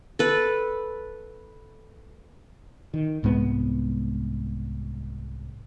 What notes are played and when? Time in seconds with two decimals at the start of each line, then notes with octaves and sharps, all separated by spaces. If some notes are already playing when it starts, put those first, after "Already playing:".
0.19 A4 B4
2.94 D#3
3.23 C2 G#2 G#3 B3